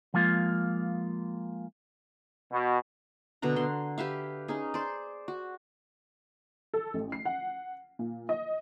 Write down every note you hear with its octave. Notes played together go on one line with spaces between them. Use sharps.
F3 G#3 A#3 F4
B2
B2 D3 F#5 A#5
D3 C6
G4 B4 E5 F5
C#4 D#4 G#4
C5 D5
F#4
A4
A1
C7
F#5
A#2
D#5